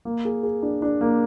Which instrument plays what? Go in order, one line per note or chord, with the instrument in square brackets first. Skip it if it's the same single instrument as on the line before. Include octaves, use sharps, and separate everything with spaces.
[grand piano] A#3
G#4
G#4
D4
D4
A#3